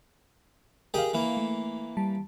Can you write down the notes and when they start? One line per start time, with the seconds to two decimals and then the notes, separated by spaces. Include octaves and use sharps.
0.94 G4 G#4 A#4 D#5 F5
1.13 E3 A#3
1.37 A3
1.97 G3 A5